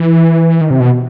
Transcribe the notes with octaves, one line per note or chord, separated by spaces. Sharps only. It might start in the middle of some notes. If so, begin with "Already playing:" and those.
Already playing: E3
D#3
C3
B2